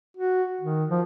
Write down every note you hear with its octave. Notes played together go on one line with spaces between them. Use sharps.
F#4
D#3
F3